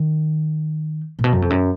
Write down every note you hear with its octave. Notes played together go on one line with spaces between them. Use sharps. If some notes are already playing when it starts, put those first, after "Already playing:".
Already playing: D#3
A#2
B2
F#2
F2
F#2